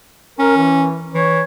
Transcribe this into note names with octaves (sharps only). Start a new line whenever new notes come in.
C#4 A#4
E3
E3 C#5